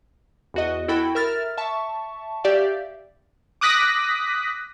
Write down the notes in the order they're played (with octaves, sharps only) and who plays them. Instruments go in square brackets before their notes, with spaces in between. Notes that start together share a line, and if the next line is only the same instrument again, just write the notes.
[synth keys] E2 F#4 D#5
E4 F#4 A4 G5 B5
A#4 E5 F6 A6
E5 A5 C#6
G4 D5 E5 F5
D6 D#6 F#6 A#6 B6